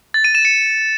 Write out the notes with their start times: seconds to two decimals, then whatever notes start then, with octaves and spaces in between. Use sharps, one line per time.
0.14 A6
0.24 D#7
0.35 E7
0.45 C#7